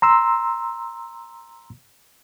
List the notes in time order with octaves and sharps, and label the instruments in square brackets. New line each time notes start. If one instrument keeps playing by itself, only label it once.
[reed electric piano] A#5 C6 E6